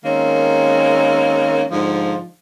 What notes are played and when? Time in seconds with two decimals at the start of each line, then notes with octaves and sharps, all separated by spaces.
0.04 D#3 G#3 A#3 C4 C#4
1.70 G#2 D3 F3